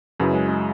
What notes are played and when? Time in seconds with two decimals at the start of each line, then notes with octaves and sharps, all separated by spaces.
0.19 F#2 C#3 F#3 E4 B4
0.33 G#3
0.48 G#3